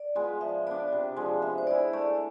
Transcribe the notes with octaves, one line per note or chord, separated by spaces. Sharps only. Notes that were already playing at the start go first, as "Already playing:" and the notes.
Already playing: D5
G#3 B3 F4
F3 E5
B3 D4 D5
C3
F3 G#3
B3 E5
C5
E4 G#4 D5
A3 D5